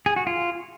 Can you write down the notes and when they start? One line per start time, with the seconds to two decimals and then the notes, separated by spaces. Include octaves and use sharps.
0.06 G#4
0.16 F#4
0.27 F4